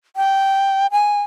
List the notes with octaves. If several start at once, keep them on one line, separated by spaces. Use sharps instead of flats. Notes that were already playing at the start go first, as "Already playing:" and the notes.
G5
G#5